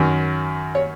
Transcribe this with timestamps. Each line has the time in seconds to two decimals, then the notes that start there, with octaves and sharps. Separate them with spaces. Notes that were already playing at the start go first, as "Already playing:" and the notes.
Already playing: F#2 D#3 F#3
0.75 C#5